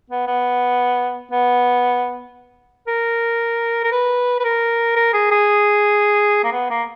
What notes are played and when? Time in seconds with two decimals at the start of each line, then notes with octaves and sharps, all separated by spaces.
0.10 B3
0.27 B3
1.32 B3
2.87 A#4
3.84 A#4
3.92 B4
4.40 B4
4.44 A#4
4.96 A#4
5.14 G#4
5.31 G#4
6.44 A#3
6.52 B3
6.70 A#3